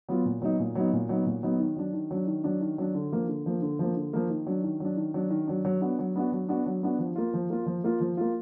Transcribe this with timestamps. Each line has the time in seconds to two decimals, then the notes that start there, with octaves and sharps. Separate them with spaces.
0.09 F#3 B3 F4
0.25 A#2
0.42 F#3 B3 D#4
0.59 A#2
0.75 F#3 B3 D#4
0.93 A#2
1.09 F#3 B3 D#4
1.26 A#2
1.43 F#3 B3 D#4
1.60 D#3
1.77 F#3 D4
1.93 D#3
2.11 F#3 D4
2.27 D#3
2.44 F#3 D4
2.61 D#3
2.78 F#3 D4
2.95 D3
3.12 F3 A#3
3.28 D3
3.46 F3 A#3
3.62 D3
3.79 F3 A#3
3.96 D3
4.13 F3 A#3
4.30 D#3
4.47 F#3 D4
4.63 D#3
4.80 F#3 D4
4.97 D#3
5.14 F#3 D4
5.30 D#3
5.47 F#3 D4
5.65 F#3
5.81 B3 D4 F#4
5.99 F#3
6.16 B3 D4 F#4
6.32 F#3
6.48 B3 D4 F#4
6.66 F#3
6.83 B3 D4 F#4
6.99 F3
7.16 A#3 F4
7.34 F3
7.50 A#3 F4
7.66 F3
7.84 A#3 F4
8.00 F3
8.17 A#3 F4